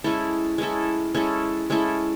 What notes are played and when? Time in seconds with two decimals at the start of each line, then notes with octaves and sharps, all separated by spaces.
0.04 G#3 C#4 E4 A4
0.58 G#3 C#4 E4 A4
1.14 G#3 C#4 E4 A4
1.70 G#3 C#4 E4 A4